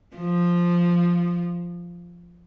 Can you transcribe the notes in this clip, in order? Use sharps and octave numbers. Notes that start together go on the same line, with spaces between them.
F3